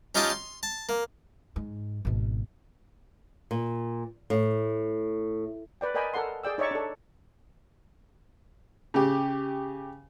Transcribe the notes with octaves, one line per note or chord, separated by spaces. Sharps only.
C#4 D#4 F4 G4 D#5 A5
C6
A5
A#3
G#2
G#1 B2
A#2
A2
B4 D5 G5
A#4 D5 D#5 G5 G#5 B5
A4 A#4 F#5 C6
G#4 D5 G5 E6
D#4 C#5 D5 E5 C#6
D4 A4
C#3 G4